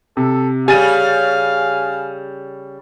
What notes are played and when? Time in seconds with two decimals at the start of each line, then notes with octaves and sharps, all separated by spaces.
0.17 C3 A4
0.68 C#3 G3 G4 F5 G#5 A6 D#7